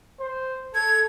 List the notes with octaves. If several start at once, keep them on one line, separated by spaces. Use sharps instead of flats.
C5
A4 G#6